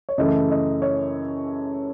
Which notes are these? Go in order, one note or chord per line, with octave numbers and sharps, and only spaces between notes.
C#5
F#2 C#3 E3 A3 D#5
D#5
C#5